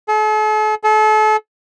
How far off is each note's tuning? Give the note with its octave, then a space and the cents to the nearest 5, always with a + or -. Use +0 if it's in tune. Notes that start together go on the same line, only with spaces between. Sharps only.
A4 -45
A4 -35